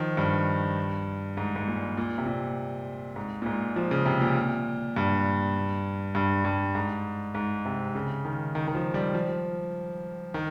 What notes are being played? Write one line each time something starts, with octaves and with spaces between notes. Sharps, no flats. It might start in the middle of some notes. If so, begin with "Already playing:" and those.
Already playing: D#3 F3
G2
G#2
G#2
A#2
A#2
C3
A#2
G#2
A#2
G#2
F3
C#3
C3
A#2
G2
G2
G2
G#2
G#2
C3
C#3
D#3
D#3
D#3
F3
G3
F3
D#3